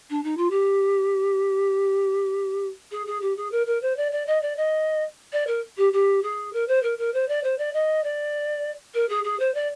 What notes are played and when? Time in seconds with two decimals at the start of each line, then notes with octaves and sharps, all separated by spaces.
0.10 D4
0.23 D#4
0.37 F4
0.50 G4
2.91 G#4
3.06 G#4
3.21 G4
3.36 G#4
3.51 A#4
3.66 A#4
3.82 C5
3.97 D5
4.12 D5
4.27 D#5
4.42 D5
4.57 D#5
5.32 D5
5.47 A#4
5.77 G4
5.93 G4
6.23 G#4
6.53 A#4
6.68 C5
6.83 A#4
6.98 A#4
7.14 C5
7.28 D5
7.43 C5
7.58 D5
7.73 D#5
8.03 D5
8.94 A#4
9.09 G#4
9.24 G#4
9.39 C5
9.54 D5